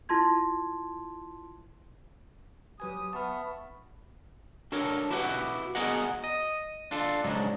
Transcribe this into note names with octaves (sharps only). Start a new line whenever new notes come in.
E4 F4 A5 C6 G#6
F#3 G4 B4 G#5 D#6
B3 E5 A5 C#6 F6
D4 F#4 A4 A#4 C#5
E4 F#4 G4 B4 F5 F#5
B3 F#4 G#4 A#4 D#5 F#5
D#5
D4 F4 A4
G#2 C#3 F#3 G#3 D4